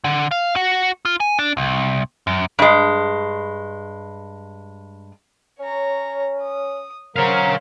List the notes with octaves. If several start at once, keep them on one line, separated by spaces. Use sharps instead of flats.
D3
F5
F#4
F4
G#5
D4
C2
F#2
G2 G#3
C#4 C#5 A#5
D#6
F#3 A#4 C5 C#5 F5